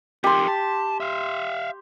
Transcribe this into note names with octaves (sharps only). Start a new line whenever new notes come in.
F2 D#3 G4 C6
A5
E5 F5